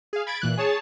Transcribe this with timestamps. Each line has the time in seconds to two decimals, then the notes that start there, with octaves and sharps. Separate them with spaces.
0.13 G#4 F5
0.27 B5 G#6 A6 D7
0.42 A#2 E3 F#6
0.57 G#4 C#5 A5